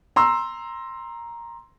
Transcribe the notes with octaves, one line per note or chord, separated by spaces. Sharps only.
A#5 C6 E6